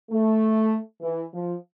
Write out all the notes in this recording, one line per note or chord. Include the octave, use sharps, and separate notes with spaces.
A3
E3
F3